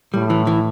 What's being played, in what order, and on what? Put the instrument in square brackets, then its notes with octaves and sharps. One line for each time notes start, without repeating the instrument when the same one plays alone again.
[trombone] A2 [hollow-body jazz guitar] G3
[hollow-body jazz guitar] E3
E3